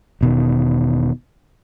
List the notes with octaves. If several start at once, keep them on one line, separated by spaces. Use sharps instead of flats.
E1 B2 D#3